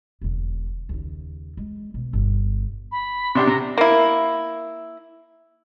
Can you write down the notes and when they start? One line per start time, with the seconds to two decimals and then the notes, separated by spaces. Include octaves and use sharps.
0.21 E1 D3
0.89 D#2 C#3
1.57 G#3
1.94 B2
2.13 G1
2.92 B5
3.35 C3 D4 G4 C6
3.47 C3 A#5
3.78 A#3 E4